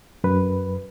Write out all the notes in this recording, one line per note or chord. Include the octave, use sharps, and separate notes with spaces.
F#2 B4